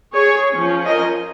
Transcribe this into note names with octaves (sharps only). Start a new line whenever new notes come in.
G#4 C#5
F3 C#4
A#4 D#5